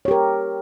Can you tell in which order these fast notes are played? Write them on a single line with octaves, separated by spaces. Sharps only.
C#5 G4 A#4